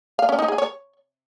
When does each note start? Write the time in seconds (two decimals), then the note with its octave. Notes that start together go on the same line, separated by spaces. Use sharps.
0.19 F5
0.29 C#4
0.39 D#4
0.48 G#4
0.58 C#5